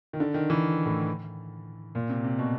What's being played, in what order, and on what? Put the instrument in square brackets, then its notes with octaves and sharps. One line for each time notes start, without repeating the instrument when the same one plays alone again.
[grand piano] D#3
D3
D#3
E3
A2
A#2
C3
C3
B2